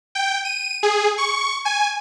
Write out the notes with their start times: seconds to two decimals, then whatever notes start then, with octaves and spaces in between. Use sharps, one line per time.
0.15 G5
0.45 D#7
0.83 G#4
1.18 C#6
1.65 G#5